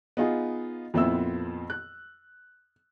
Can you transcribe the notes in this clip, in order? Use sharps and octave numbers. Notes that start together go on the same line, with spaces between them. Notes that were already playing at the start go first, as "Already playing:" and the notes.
B3 D#4 F4 G#4
F2 A#2 B3 C4 E4 E6
F#6